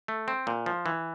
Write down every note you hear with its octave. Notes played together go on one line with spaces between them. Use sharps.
A3
C4
A#2
F3
E3